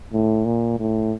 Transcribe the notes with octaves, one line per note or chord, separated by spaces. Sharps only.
A2
A#2
A2